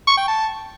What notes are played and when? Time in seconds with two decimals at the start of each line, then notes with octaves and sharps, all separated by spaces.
0.07 C#6
0.17 G5
0.28 A5